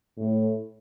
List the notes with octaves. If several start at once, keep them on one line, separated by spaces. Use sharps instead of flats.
A2